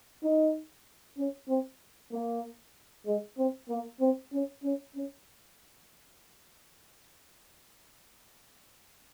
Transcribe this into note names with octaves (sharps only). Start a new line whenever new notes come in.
D#4
C#4
C4
A#3
G#3
C4
A#3
C4
C#4
C#4
C#4